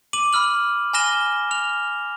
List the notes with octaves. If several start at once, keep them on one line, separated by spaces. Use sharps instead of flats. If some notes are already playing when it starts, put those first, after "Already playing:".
D6 D#7 F#7
B5 E6 F6 F#7
G#5 B5 F6 A#6 E7 G7
F6 F7